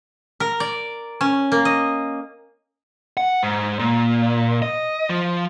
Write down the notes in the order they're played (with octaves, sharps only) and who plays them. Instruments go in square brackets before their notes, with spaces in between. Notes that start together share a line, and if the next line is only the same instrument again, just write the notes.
[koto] A#4
D5
C#4
A#3
D#5
[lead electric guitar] F#5
G#2
A#2
D#5
F3